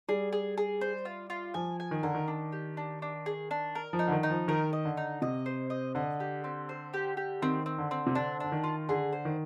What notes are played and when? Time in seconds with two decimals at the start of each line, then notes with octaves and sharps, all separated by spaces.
0.09 G3 G#4
0.33 G#4
0.58 G#4
0.81 C5
1.05 F4
1.30 F4
1.54 F3 G#5
1.80 G#5
1.91 D#3
2.03 D3 A#4
2.14 D#3
2.28 D4
2.52 G4
2.77 D4
3.02 D4
3.26 G#4
3.51 D4
3.75 A#4
3.93 F3
3.99 D#4
4.08 D3
4.12 D#3
4.23 D#4
4.30 F3
4.48 D#3 A#4
4.73 D#5
4.85 D3
4.97 D#4
5.22 C3 D#5
5.46 C5
5.70 D#5
5.95 D3 D#5
6.20 G4
6.44 C4
6.69 C5
6.94 G4
7.17 G4
7.42 D#3 C4
7.66 C4
7.78 D3
7.91 C4
8.07 C3
8.15 D3 D4
8.40 D3 D4
8.52 D#3
8.64 F4
8.89 D3 G#4
9.13 C5
9.25 D#3